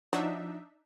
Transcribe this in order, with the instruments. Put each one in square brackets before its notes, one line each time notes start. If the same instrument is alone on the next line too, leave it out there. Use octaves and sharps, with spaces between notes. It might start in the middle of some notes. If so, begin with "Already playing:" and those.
[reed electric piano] F3 [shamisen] F#3 [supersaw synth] D4 D#4 E5